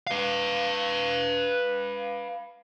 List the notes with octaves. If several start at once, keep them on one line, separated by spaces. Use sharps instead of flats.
B4 F5